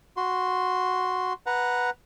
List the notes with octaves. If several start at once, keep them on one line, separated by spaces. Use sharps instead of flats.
F#4 C6
B4 F#5 A#5